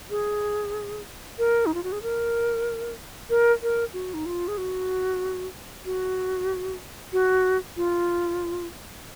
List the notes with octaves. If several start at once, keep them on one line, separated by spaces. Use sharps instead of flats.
G#4
A#4
D#4
F4
F#4
G#4
A#4
A#4
A#4
F#4
D#4
F4
G#4
F#4
F#4
F#4
F4